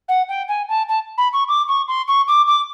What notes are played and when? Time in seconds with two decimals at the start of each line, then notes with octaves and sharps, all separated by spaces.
0.08 F#5
0.29 G5
0.48 G#5
0.69 A5
0.89 A5
1.18 B5
1.33 C#6
1.48 D6
1.68 C#6
1.88 C6
2.08 C#6
2.28 D6
2.47 D6